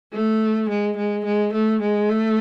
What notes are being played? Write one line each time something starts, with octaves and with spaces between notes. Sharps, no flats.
A3
G#3
G#3
G#3
A3
G#3
A3